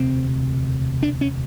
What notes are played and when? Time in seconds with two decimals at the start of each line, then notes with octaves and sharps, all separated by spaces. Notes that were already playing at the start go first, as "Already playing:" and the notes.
Already playing: E1 D2 C3 C4
1.03 D4
1.21 C#4